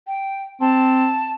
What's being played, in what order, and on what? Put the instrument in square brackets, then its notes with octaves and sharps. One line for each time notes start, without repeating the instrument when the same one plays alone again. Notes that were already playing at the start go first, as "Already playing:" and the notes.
[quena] G5
[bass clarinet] C4 [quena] A5